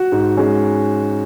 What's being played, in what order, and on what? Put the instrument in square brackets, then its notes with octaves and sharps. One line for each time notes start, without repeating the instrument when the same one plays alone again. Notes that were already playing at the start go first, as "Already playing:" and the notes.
Already playing: [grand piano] F#4
G#2
G#3 C#4